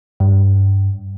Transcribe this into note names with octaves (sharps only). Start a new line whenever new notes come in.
G2